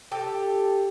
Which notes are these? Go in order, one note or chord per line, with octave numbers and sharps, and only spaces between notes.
G4 A4